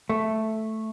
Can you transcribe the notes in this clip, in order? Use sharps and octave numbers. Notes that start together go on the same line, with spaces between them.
A3